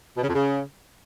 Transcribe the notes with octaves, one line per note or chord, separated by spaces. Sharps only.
B2
C#3
F2
C#3